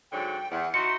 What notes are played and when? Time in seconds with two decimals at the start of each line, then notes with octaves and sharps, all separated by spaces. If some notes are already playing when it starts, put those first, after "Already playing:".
0.12 G#2 D3 F#3 G5
0.51 E2 F#5
0.74 D#4 E4 F#4 C6 C#7